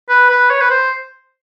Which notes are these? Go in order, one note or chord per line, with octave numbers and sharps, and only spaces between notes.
B4
B4
C#5
B4
C5